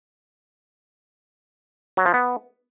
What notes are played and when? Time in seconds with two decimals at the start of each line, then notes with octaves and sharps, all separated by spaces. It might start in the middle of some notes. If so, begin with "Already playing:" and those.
1.97 F#3
2.06 F3
2.14 B3